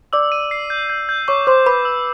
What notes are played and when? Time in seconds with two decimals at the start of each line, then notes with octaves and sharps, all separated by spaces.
0.13 D5 D6 E6
0.32 D#7
0.51 C7
0.70 G6
0.90 G6
1.09 G6
1.28 C#5 C#6 D6
1.47 C5 C6 D6
1.66 B4 B5 D6
1.85 E6